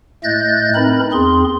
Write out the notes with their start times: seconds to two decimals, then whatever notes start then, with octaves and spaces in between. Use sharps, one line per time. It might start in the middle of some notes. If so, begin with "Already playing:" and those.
0.24 A2 A3 D#5 F#6 G6 A6
0.75 C4 D#4 A#4 B4 B5
1.12 E2 C4 G#4 C6